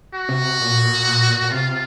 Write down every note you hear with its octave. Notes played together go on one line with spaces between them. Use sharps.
F#4
C3
A#2
A#2
C3 F4